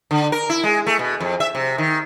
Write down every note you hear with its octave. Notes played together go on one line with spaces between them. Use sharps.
D3
A#4
E4
G#3
A3
B2
F2
E5
C3
D#3